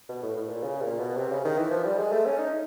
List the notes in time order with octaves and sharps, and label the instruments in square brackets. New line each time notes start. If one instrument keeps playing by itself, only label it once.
[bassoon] B2
A2
A2
A#2
C#3
A#2
B2
C3
C#3
D#3
E3
F3
G3
G#3
A3
C#4
D#4